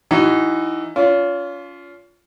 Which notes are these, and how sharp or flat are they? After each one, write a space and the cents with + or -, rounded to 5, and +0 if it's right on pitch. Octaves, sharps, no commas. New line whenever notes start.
E3 +5 D#4 -5 F#4 +30
C#4 +40 F4 +0